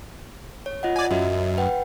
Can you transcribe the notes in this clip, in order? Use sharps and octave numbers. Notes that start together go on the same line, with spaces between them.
C#5
F4 D#5 F#5
D5 G#5
F#2 F#4 D#5 E5
B4 F#5 G5